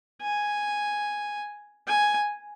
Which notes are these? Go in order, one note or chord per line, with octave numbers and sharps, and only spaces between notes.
G#5
G#5